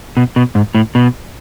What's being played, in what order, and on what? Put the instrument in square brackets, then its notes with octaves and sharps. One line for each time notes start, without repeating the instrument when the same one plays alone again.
[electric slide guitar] B2
B2
G#2
A2
B2